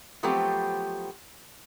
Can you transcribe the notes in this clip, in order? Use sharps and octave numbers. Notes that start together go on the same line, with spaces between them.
F3 F#3 A3 B3 C4 G4